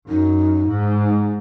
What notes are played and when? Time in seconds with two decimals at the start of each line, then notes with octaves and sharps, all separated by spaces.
0.09 F#2 D#4
0.69 G#2